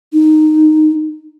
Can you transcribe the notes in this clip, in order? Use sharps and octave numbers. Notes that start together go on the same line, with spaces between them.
D#4